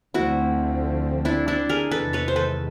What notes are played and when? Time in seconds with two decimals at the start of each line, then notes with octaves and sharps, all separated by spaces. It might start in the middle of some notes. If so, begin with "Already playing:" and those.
0.14 D2 D3 F3 A3 C4 E4 F#4
1.25 D4 E4
1.48 D4 E4
1.69 G#4 A#4
1.91 E2 C3 D#3 G#3 A4 B4
2.13 B4 C#5
2.28 C5
2.36 A4 B4